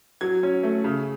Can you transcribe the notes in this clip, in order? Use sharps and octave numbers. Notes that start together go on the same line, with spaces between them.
F#3 G#6
C#4
A3
C#3